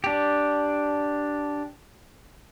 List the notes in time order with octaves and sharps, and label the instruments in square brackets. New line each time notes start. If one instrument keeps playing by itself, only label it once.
[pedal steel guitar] D4 G4